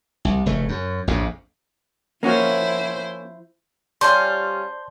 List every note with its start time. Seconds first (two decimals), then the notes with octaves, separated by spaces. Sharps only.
0.25 C2
0.46 F1 C#3 A3
0.69 F#2
1.08 A#1 F2 A2
2.23 F3 A#3 C#4 E4 F#4 C5
4.01 G3 C#4 F4 C5 D5 A5 C6